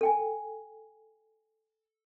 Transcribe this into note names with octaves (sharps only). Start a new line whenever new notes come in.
A4 G5 G#5